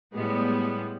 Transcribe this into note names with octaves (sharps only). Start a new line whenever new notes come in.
A2 G3 G#3 B3